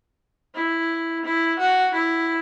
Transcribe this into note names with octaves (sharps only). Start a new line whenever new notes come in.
E4
E4
F#4
E4